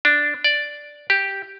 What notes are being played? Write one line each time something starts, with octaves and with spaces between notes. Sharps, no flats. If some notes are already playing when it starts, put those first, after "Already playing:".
D4
D5
G4